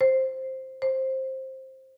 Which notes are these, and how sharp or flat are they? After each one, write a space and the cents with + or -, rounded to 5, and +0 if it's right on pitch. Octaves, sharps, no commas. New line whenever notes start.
C5 +5
C5 +15